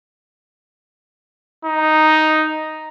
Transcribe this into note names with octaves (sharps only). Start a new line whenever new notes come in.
D#4